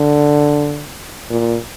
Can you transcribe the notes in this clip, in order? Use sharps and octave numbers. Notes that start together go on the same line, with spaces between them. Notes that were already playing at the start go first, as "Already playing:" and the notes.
Already playing: D3
A#2